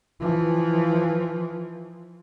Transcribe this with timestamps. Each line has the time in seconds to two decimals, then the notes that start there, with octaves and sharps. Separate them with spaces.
0.20 E3 F3